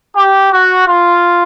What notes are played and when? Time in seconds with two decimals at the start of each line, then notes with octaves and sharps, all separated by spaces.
0.16 G4
0.52 F#4
0.88 F4